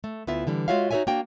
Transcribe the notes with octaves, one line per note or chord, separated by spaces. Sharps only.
A3
D2 B3 E4 F4 E5
D3 E3 G3
G#3 F4 F#4 C#5 E5 F5
D#4 F#4 A4 C#5 E5 G#5
A#3 D4 F#4 G5